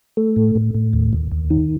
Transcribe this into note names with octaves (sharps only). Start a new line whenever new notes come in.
A3
A2
A2
A2
D#2
D#2
D#2
D#3